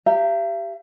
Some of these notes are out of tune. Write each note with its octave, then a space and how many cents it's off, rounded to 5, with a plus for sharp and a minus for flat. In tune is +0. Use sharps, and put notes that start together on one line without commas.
G4 +0 E5 +45 A#5 -30